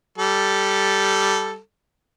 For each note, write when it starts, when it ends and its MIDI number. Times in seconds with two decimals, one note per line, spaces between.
0.18 1.59 55
0.18 1.59 69